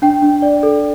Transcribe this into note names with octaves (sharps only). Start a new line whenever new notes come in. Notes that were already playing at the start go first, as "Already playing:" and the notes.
D4 G5
D4
D5
A4